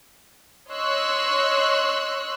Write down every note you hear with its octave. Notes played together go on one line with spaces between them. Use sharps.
C#5 D#5 C6 C#6 E6 F#6